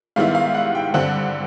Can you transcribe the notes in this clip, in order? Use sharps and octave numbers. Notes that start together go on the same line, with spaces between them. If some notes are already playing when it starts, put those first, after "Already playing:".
G#2 D#3 G3 B3 E4 F5
F5
F#5
G5
G2 D3 G3 C4 F#5